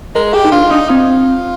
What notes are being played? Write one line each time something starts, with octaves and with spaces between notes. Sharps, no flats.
G#3 A#4
G4 G#4
D#4
D4 F4
D4 D#4
C4 F4